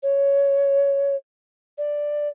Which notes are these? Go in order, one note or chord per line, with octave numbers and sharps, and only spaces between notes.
C#5
D5